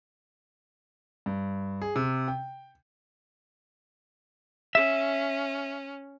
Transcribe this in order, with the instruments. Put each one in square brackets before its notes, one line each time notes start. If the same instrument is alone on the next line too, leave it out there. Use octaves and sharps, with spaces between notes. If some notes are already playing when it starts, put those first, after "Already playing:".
[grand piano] G2
G#4
C3
G5
[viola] C#4 [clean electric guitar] E5